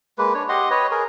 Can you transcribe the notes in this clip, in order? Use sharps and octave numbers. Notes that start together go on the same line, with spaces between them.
G#3 A#3 B4
D4 C#5
G4 D#5 F#5 C6
B4 C#5 D#5
G#4 A#4